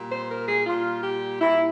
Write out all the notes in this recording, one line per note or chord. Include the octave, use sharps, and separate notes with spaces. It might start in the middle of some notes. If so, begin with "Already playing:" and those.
Already playing: A#2 G3
C5
A#4
G#4
A#2 G3 F4
G4
A#2 G3 E4